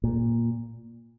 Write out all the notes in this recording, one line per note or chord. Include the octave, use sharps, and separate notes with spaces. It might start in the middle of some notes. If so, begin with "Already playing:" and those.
A#2